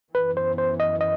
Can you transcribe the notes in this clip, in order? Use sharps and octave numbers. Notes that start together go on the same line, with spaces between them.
F#2 E3 B3 B4
C5
C5
D#5
D#5